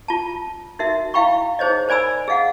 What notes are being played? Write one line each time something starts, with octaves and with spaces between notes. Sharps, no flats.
F4 A5
D#4 F#4 A#4 E5
E4 F5 G5 B5 C#6
D#4 G#4 C5 C#5 D#5
A#4 C5 D5 G#5 B5 E6
G#4 D#5 F5 F#5